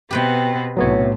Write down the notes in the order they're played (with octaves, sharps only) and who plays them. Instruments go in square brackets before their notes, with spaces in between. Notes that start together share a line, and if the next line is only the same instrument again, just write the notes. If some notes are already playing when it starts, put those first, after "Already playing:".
[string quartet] B2 B3 C4 [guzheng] G4 B4 G5
[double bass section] B1 A2 [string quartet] C3 [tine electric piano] F#3 B3 C#5